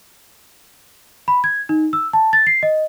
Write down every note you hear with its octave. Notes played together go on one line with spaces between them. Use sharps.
B5
G#6
D#4
E6
A5
A6
C7
D#5